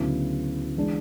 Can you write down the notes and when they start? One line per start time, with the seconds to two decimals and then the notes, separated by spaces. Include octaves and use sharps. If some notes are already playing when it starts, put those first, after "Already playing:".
Already playing: D2 C#3 F#3 B3 E4
0.76 E3 G#3 D4